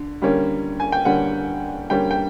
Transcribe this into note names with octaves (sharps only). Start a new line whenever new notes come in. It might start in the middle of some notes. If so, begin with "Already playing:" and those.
Already playing: D3
D3 G3 A#3 C#4
G#5
G5
D3 G3 A#3 C#4 F#5
D3 G3 A#3 C#4 G5
G5